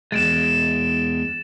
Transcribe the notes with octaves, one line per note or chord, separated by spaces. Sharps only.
E2 G#3 A6 D7 E7